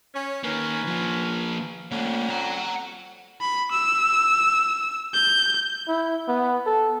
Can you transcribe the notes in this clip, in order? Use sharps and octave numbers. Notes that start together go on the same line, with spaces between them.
C#4
D#3 A#3 C#4 A#4 B4
F3 A#3
F2 D3 A3 A#3 C#4
F#5 A#5
B5
E6
G6
E4
B3
A4